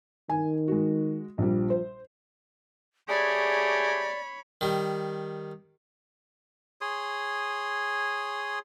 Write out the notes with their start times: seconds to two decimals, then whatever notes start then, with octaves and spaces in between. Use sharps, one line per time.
0.30 D#3 G#5
0.68 G#3 F#4
1.38 A#1 F3 G3
1.70 C5
3.09 A3 G4 G#4 C#5 D5 B5
4.61 D#3 G3
6.81 G#4 C#5 C6 D#6